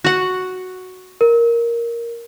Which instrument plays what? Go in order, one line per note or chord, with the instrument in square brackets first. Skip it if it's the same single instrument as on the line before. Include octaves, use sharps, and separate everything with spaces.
[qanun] F#4 F#5
[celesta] A#4